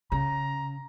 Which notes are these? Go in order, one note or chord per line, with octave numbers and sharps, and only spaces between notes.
C#3 A#5